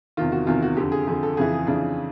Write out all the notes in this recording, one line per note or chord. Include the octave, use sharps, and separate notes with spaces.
E2 C3 D#3 F4
F#4
E2 C3 D#3 F4
F#4
F2 D3 G4
G#4
F2 D3 G#4
A4
F2 C#3 E3 G#4
G#4
F2 C#3 E3 D4